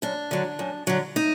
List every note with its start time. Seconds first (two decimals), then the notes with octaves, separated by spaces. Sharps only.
0.02 F#2 D4
0.31 D3 F#3
0.59 F#2
0.87 D3 F#3
1.16 D#4